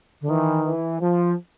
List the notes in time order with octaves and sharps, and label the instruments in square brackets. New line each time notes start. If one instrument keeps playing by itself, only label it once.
[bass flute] D3
[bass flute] D#3 [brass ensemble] E3
[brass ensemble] E3
F3